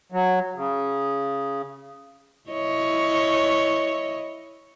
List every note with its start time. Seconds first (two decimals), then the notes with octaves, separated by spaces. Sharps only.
0.12 F#3
0.56 C#3
2.50 E4 C#5 D#5